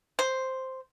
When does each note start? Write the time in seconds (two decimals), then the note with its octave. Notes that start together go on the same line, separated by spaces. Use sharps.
0.19 C5